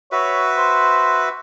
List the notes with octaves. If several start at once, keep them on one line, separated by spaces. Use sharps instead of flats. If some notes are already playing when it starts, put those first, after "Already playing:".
F#4 B4 C#5 E5
C5